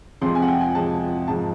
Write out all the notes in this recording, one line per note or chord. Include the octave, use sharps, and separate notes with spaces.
F2 C3 F3 G#3 C6
G#5
F#5
G5
G#5
F2 C3 F3 G#3 A5
G#2 F3 G#3 A5